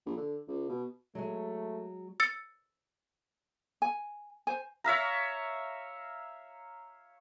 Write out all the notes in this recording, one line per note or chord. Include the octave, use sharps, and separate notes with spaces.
A#1
D3
C#2
B2
F#3 G#3 A3
E6 A6 C#7
G#5
C5 G#5
C#5 E5 F5 A#5